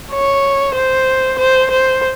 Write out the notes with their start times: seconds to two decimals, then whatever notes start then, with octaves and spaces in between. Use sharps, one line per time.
0.11 C#5
0.75 C5
1.39 C5
1.71 C5